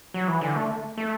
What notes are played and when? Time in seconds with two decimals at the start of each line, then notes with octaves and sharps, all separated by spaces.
0.14 F#3
0.28 E3
0.41 D3
0.56 A3
0.97 A3